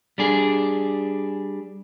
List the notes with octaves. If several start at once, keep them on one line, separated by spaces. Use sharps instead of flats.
G3 D4 G#4